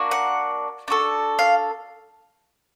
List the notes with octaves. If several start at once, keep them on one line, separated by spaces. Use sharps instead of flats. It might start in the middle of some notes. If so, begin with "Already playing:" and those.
Already playing: A#3 D4 F#4
F#5
D4 F#4 A4
F5